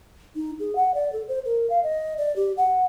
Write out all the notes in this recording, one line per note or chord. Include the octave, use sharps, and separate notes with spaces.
D#4
G#4
F#5
D5
A4
C5
A#4
F5
D#5
D5
G4
F#5